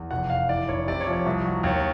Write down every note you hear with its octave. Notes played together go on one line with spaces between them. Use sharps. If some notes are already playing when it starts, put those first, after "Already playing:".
Already playing: E2
F1 F#5
F1 F5
E3 D5
F1 C#5
C3 D5
C#5
F3
C#5
C2
F#3
D#2 C#5